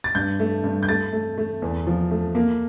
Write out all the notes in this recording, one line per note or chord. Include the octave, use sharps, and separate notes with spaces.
A6
G2 G6
A3
G2
G6
A3 A6
A3
A3
E2
F3
A3
A#3